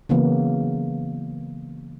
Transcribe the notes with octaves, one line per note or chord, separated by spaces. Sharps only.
C#3 E3 F#3 A#3 B3